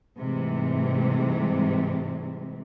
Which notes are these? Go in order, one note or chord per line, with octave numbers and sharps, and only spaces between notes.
G#2 C3 E3 G3 A3